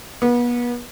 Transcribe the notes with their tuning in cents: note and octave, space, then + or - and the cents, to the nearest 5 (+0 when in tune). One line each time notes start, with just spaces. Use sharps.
B3 -35